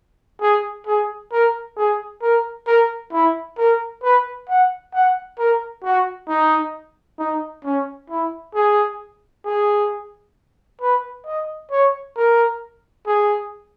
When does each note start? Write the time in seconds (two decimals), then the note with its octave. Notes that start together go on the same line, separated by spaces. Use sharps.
0.41 G#4
0.87 G#4
1.32 A#4
1.77 G#4
2.22 A#4
2.67 A#4
3.12 E4
3.58 A#4
4.03 B4
4.49 F#5
4.94 F#5
5.39 A#4
5.84 F#4
6.28 D#4
7.19 D#4
7.65 C#4
8.10 E4
8.55 G#4
9.45 G#4
10.81 B4
11.26 D#5
11.71 C#5
12.16 A#4
13.07 G#4